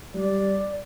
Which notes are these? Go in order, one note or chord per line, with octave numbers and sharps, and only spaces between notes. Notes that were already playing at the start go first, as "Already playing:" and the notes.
G3 D5